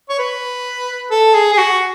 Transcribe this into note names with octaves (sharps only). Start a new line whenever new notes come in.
C#5
B4
A4
G#4
G#4
F#4